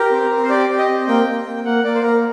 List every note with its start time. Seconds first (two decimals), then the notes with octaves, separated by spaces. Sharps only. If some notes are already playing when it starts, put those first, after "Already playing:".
Already playing: G4 A#4
0.11 C4
0.30 C4
0.43 C5
0.50 G4 D5
0.69 G4
0.78 D#5
0.89 C4
1.07 A#3 G5
1.26 A#3
1.45 A#3
1.64 A#3 F#5
1.84 A#3 D5
1.95 C5
2.02 A#3 A#4